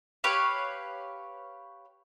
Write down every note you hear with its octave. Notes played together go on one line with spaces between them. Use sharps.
G4 B4 C#5 F5